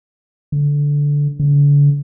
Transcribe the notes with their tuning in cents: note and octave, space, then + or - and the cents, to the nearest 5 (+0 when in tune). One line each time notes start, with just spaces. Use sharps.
D3 -15
D3 -40